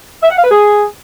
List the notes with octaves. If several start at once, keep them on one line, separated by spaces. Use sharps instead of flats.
E5
F#5
F5
B4
G#4